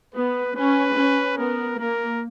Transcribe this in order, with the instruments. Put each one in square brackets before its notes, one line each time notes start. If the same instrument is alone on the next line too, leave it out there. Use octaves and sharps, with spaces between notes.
[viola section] B3 [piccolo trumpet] B4
[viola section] C#4 [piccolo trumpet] B4
[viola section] C#4
[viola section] B3 [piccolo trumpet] A#4
[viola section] A#3 [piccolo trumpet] A#4